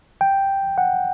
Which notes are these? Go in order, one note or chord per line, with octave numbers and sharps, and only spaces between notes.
G5
F#5